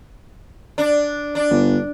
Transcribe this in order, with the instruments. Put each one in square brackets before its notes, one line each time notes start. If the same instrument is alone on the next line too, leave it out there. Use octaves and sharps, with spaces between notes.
[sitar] D4
D4
[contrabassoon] G1